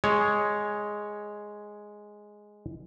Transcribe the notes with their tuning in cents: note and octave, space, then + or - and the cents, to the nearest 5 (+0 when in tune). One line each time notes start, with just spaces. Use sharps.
G#3 +0 C#5 +0